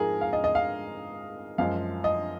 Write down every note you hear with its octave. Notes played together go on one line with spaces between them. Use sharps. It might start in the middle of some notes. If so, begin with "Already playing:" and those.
Already playing: G#2 F3 G#3 G#4 A#4
F5
D#5
D#5
F5
F#2 F3 G#3 F5
D#5